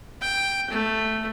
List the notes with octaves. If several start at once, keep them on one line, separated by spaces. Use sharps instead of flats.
G5
A3